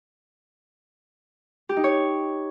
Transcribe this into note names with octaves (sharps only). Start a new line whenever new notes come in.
G4
D#4
C#5